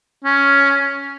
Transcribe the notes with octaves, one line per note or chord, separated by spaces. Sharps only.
C#4